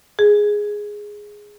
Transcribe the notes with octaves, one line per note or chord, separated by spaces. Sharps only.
G#4